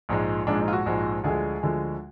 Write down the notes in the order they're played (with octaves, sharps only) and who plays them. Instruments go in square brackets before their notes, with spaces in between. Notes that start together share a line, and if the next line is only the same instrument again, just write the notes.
[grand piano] A#1 G#2 F3 G#3
A#1 G#2 F3 G#3 D4
D#4
F4
F#4
A#1 G#2 F3 G#3
D2 D3 F3 G#3 G#4
D2 D3 F3 G#3